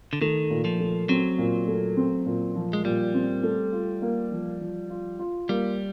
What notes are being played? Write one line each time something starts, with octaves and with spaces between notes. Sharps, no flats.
D3
D#3 A3
A#2
F3
A3
F#3 C4
A#2
A3
C4
A#2
F3
G#3
A#2 G3
C4
A3
F4
A#3
F3
F3
F4
F4
G3 A#3